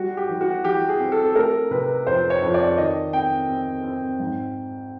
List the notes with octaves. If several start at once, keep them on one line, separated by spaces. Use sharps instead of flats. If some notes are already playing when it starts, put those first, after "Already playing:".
Already playing: G3 F#4
G4
E3
F#4
E3 G4
G#4
C4
A4
A3 A#4
C3 B4
F2 C5
C#5
F2
D5
D#3 D#5
C4 G5
C4
C4
G#2